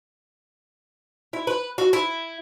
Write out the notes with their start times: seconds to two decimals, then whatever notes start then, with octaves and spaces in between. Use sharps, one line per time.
1.33 E4
1.47 B4
1.78 F#4
1.93 E4